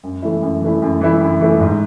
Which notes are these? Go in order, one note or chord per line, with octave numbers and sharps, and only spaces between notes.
F#2
E3 A3 E4
F#2
E3 A3 E4
F#2
E3 A3 E4
F#2
E3 A3 E4
G#2